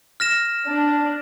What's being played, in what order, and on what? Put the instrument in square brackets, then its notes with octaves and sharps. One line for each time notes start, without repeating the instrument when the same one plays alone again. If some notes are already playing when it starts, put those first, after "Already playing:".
[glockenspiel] F6 A#6 E7
[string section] D4